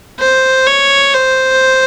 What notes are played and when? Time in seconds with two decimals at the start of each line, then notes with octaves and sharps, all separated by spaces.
0.20 C5
0.67 C#5
1.14 C5